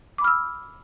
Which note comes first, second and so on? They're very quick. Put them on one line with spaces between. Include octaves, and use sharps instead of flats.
D6 B5 F6 E6